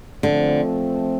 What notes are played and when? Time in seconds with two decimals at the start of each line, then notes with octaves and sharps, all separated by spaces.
0.23 D3 F3 A3 C4